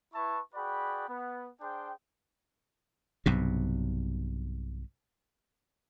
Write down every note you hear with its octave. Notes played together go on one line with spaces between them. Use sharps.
E4 B4 E5 A5 C#6
F#4 G#4 B4 D5 G5 B5
B3
D4 G#4 C5 G5
B1 G2 C3